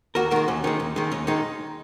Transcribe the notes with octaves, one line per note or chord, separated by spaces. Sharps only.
D#2 F#4 A#4
D#3 G#3 F#4 A#4
D#2 C#4
D#3 G#3 C#4
D#2
D#3 G#3
D#2 C#4
D#3 G#3 D#4